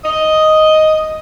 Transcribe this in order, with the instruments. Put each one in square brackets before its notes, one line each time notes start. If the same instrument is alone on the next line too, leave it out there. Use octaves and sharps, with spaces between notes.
[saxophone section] D#5